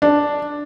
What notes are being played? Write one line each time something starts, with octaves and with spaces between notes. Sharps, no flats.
D4